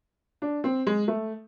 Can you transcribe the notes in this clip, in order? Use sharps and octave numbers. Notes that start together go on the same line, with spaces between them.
D4
C4
G#3
A3